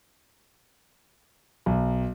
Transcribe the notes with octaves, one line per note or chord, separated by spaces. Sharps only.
B1